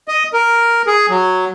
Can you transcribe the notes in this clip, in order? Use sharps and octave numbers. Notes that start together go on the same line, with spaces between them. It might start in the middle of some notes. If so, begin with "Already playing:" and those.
D#5
A#4
G#4
F#3